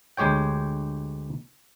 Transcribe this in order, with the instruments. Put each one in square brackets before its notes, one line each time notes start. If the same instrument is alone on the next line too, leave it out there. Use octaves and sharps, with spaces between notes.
[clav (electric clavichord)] D2 G#3 G4 C#5 G5